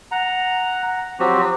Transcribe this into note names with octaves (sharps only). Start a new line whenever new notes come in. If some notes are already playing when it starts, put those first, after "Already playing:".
F#5 A#5
F3 F#3 C4 F#4 G4